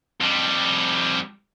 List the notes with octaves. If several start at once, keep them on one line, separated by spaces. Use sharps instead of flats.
F2 G3